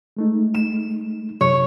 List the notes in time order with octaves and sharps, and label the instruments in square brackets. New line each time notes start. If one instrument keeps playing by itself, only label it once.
[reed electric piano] G#3 A3 D#4
[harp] E7
[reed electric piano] F#2 C3 F#3 [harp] C#5